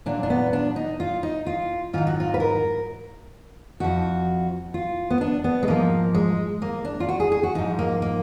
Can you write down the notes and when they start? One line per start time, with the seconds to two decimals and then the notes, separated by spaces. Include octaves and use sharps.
0.06 A#2 F#3 D4
0.23 D4
0.30 B3
0.53 D4
0.76 D#4
1.00 F4
1.23 D#4
1.46 F4
1.93 G#2 D#3 F#3 F4
2.07 F#4
2.20 F4
2.34 B4
2.40 A#4
3.80 F2 F3 F#4
4.74 F4
5.10 B3
5.21 D4
5.44 B3
5.63 G#3
5.67 G#2 F3 A#3
6.14 G#3
6.62 A#3
6.85 D4
7.00 F4
7.09 F#4
7.20 G#4
7.32 G#4
7.43 F#4
7.55 G#2 F3 D#4
7.79 A#3
8.02 A#3